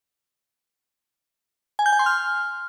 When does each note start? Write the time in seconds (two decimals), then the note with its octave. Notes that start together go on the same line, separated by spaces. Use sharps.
1.79 G#5
1.86 G6
1.93 G#5
1.99 C6
2.06 F6